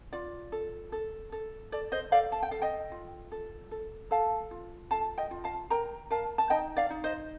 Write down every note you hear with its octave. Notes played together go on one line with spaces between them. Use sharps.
F4 D5
A4
A4
A4
A4 D5
C5 D#5
A4 D5 F5
A5
G5
A4 F5
D#5 G5
F4
A4
A4
A4 F5 A5
F4
A4 F5 A5
D#5 G5
F4
F5 A5
A#4 G5 A#5
A#4 F5 A5
A5
D#4 D#5 G5
D5 F5
D#4
C5 D#5